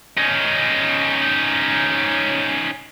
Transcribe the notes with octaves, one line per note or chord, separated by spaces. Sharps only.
C#4 D#4